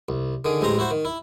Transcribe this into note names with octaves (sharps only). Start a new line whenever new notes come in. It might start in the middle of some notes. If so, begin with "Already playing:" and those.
C2
D3 D#3 G#4
A1 G#3 C4 A#5 C6
E4 F#4 C5
D#3
E4